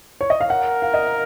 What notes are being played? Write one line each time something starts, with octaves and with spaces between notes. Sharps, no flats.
C#5
D#5
F5
A#4 F#5
F5
D#5